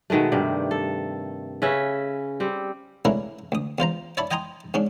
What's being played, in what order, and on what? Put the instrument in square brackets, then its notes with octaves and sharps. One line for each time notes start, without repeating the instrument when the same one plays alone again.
[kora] B2 D#3 G#3 A3
G2 C3 G3
A4
C#3 C#4 B4 E5
G3 C4
[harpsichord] C#3 A3 D4 E4 A#4 B4
D2 D#6
E2 F4 C5 A#5
C#5 D5 E5 A5 B5
D#5 G5 G#5 A#5 C6 D#6
G#2 C#4 D4